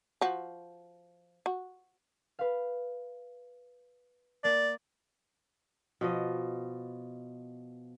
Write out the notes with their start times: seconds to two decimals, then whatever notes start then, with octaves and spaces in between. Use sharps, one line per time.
0.21 F3 F#4
1.46 F#4
2.39 B4 F5
4.44 A#3 D5
6.01 B2 F3 D#5